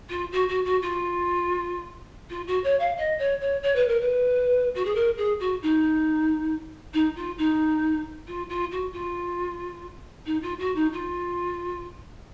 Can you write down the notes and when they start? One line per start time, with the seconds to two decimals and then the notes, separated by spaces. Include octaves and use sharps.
0.09 F4
0.32 F#4
0.48 F#4
0.64 F#4
0.82 F4
2.30 F4
2.47 F#4
2.63 C#5
2.79 F5
2.97 D#5
3.18 C#5
3.40 C#5
3.62 C#5
3.75 B4
3.87 A#4
4.00 B4
4.74 F#4
4.85 G#4
4.95 A#4
5.17 G#4
5.39 F#4
5.62 D#4
6.93 D#4
7.16 F4
7.38 D#4
8.27 F4
8.49 F4
8.71 F#4
8.92 F4
10.26 D#4
10.42 F4
10.59 F#4
10.75 D#4
10.92 F4